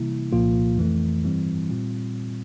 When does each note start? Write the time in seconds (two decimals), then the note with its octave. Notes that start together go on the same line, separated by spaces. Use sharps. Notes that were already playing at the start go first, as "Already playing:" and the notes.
Already playing: C3 E3 G3 A#3 E4
0.32 C2 A#2 F3 A#3 F4
0.78 F2 E3 A3
1.24 G2 E3 G3 C4 E4
1.69 A#2 G3 C4 F4